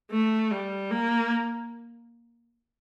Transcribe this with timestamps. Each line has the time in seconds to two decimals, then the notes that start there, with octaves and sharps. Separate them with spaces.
0.11 A3
0.51 G3
0.91 A#3